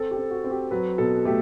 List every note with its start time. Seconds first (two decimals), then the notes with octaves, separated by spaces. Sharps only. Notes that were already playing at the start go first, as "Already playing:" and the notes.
Already playing: C4 A4
0.11 G4
0.17 C4
0.31 F#4
0.44 C4
0.51 G4
0.71 F#3 B4
0.98 B2 A4
1.25 A3 G4